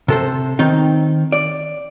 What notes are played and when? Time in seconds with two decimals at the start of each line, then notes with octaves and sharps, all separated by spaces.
0.08 C3 A4 C5
0.59 D#3 C4 D#4
1.32 D5